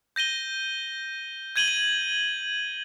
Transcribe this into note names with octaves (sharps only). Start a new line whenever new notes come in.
G6 A#6 D#7 G7
G6 G#6 D#7 F#7 G7
D#7